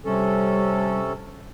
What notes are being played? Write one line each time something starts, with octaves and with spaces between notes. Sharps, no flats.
C3 G3 C#4 A4